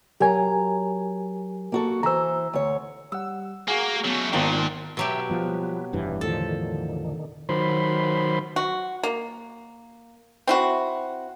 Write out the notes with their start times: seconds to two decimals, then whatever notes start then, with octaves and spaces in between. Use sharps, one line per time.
0.20 F#3 G4 A#4 G#5 A#5
1.72 A#3 F#4 A4
2.03 E3 C5 A#5 E6
2.53 D2 C#5
3.12 G3 F#5 E6
3.68 A#3 F#4 G#4 G#5 D6
4.04 F#3 A3 B3 C#4
4.33 G#1 A#2 D#3 F3 B3 D4 D#4 G5
4.97 B2 F#3 G4 E5 G5 E6
5.30 F3 G3 B3
5.93 F1 G2 E3
6.21 E2 A2 D3 D#3 F3 A4
7.49 D#3 F#3 C5 B5 C6
8.56 F#4
9.03 A#3
10.47 C4 E4 F#4